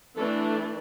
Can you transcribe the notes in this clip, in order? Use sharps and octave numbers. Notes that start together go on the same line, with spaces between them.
E3 A3 D4 A4